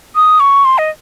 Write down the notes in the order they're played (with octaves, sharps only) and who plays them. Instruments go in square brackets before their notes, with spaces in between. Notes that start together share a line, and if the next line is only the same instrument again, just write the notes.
[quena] D#6
C#6
C6
D#5